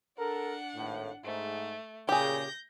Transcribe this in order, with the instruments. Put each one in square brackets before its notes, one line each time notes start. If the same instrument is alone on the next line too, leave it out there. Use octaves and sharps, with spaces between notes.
[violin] D4 F#5 [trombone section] A4 A#4
[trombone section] G#1 A2
[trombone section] G#2 [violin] A3
[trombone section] A#2 C#3 [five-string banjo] G4 G#4 [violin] G6 A#6